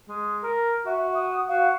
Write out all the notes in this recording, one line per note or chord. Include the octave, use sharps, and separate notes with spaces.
G#3
A#4
F#4 E5
D#6
F#4 F5